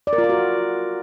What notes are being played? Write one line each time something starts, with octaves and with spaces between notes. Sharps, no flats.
D5
A#4
F4
A#4
F#4